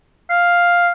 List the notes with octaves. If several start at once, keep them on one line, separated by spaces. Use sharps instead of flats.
F5